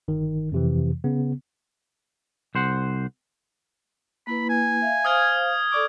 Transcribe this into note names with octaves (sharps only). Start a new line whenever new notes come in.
G1 D#3
F2 C3 E3
C#3 B3
C2 C5 F#5
A#3 E4 B4 B5
G#5
E5 F5
C5 F5 D#6 F6 G#6
A4 D5 C#6 D6